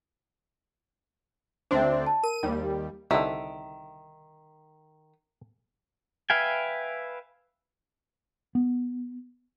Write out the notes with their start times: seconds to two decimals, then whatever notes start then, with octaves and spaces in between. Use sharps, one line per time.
1.71 D2 C4 D4 C5 E5
2.07 A5
2.23 A#4 D#7
2.43 D#2 G3
3.11 C2 D3 D#3 E5
6.30 B4 E5 F5 G5 G#5
8.55 B3